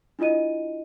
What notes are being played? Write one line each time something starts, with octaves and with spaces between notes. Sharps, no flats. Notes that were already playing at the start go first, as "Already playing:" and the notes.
D4 E4 F4 D#5 D#7